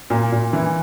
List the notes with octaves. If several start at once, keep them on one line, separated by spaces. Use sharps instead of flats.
A#2
A#2
E3